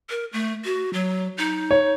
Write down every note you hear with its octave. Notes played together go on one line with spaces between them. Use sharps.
A#4
A3
F#4
F#3
D#4
C#5